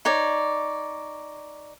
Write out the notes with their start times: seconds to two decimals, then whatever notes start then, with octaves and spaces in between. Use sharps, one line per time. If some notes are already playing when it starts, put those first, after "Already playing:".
0.05 D#4 C#5 D5